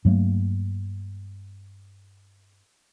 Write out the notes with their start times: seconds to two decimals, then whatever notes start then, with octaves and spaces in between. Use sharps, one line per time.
0.05 G2 F#3 A3 A#3